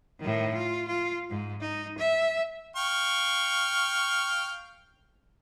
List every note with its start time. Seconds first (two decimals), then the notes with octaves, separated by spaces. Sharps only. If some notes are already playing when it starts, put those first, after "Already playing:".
0.20 A2 D#3
0.54 F4
0.88 F4
1.30 G#2
1.61 D#4
1.98 E5
2.76 F5 G5 C#6